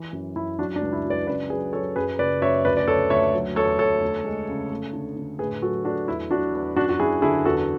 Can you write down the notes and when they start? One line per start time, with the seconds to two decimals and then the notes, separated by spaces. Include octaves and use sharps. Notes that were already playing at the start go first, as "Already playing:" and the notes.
Already playing: E3
0.13 F#2
0.36 F#2 E4
0.59 F#3 D4 F#4
0.76 D4
0.81 C#2
0.93 E4
1.05 F#3
1.10 B4 D5
1.27 C#3 B4 D5
1.50 F#3 G#4 B4
1.73 F#3 A4 C#5
1.96 F#2 G#4 B4
2.19 F#1 B4 D5
2.42 F#2 C#5 E5
2.65 D2 B4 D5
2.77 D5
2.87 D2 A4 C#5
3.10 D2 C#5 E5
3.33 F#3
3.56 E2 A4 C#5
3.79 E2 A4 C#5
4.02 D2
4.25 G#3
4.48 C#3
4.71 A3
4.93 D3
5.16 D3
5.39 A2 G#4 B4
5.62 F#3 F#4 A4
5.84 A3 D4 F#4
6.08 E2 E4
6.31 F#3 D4 F#4
6.54 E2
6.76 F#2 D4 F#4
6.89 F#4
6.99 F#2 E4 G#4
7.22 D3 E4 G#4
7.45 E2 F#4 A4